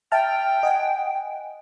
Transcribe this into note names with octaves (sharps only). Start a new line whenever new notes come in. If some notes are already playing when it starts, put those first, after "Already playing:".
E5 G5 A5 F6
D#5 F#5 G#5